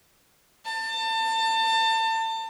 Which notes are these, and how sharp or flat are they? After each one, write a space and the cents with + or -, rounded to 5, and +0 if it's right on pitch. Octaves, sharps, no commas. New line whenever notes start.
A5 +30